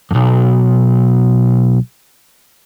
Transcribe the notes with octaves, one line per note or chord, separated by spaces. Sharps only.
B1 F2